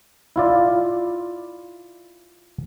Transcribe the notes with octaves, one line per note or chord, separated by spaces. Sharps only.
E4 F4 D5